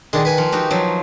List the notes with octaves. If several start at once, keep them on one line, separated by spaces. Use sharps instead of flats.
D#3 G#3 D4
B4 G#5
F3
D#4 F#4 G4
F3 F#3